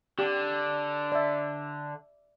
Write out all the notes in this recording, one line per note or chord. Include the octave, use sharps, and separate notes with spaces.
D3 G4
D5 E5